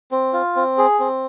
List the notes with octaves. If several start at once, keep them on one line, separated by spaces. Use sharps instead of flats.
C4
F4
C4
G#4
C4